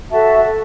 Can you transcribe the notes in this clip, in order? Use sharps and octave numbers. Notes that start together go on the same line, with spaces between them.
F#4 A4 E5 A5